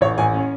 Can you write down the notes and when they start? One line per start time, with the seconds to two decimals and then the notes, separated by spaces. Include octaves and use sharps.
0.01 A1 C#5
0.18 A1 G#5
0.34 C#4